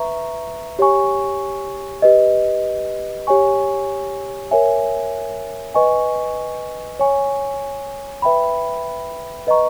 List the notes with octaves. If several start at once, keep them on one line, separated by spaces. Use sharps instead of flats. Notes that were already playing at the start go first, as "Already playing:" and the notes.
Already playing: B4 E5 A#5 C#6
G4 C#5 G#5 C#6
G4 B4 D#5
G4 C#5 G#5 C#6
A#4 C#5 E5 G#5
B4 D#5 G#5 C#6
C#5 G#5 C#6
B4 E5 G5 B5
B4 D#5 A#5 C#6